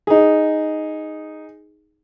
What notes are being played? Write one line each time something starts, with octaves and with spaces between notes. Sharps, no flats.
D#4 G#4